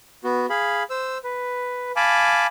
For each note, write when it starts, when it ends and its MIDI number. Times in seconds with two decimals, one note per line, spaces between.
0.24 0.46 59
0.24 0.46 66
0.50 0.83 68
0.50 0.83 77
0.50 0.83 83
0.90 1.18 72
0.90 1.18 88
1.24 1.92 71
1.96 2.47 77
1.96 2.47 80
1.96 2.47 81
1.96 2.47 83
1.96 2.47 86